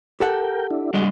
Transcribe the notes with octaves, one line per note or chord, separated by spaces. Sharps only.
G4 A4 A#4 F#5 G5
D4 E4
G3 G#3 D4 F#4 D#5